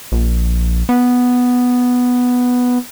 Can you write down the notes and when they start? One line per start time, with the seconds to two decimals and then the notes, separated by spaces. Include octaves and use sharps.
0.12 A#1
0.89 B3